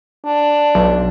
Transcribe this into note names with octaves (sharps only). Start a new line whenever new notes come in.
D4
B1